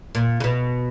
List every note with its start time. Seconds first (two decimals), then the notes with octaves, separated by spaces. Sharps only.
0.15 A#2
0.40 C#3
0.44 B2